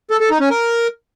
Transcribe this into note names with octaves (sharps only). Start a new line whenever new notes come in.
A4
A4
D#4
C#4
A#4